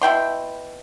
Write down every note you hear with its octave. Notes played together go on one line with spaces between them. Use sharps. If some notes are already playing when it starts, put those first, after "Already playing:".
B2 E4 G5 C6